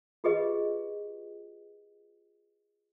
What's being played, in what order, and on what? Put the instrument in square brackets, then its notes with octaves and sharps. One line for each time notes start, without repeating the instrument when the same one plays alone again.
[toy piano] F4 G4 G#4 B4 D#5